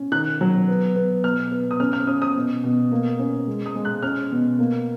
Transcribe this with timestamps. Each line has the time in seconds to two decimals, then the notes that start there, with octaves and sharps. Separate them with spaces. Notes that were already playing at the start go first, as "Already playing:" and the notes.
Already playing: C#4
0.12 D#3 F#6
0.41 F#3
0.68 B3
0.96 B3
1.24 B2 F6
1.51 B3
1.71 D#6
1.80 C#4 F6
1.93 F6
2.07 C#4 D#6
2.22 D#6
2.35 B2
2.64 B2
2.92 A#3
3.19 C#4
3.47 G#3
3.66 D#6
3.75 G#3
3.85 F#6
4.03 C#4 F6
4.31 B2
4.59 A#3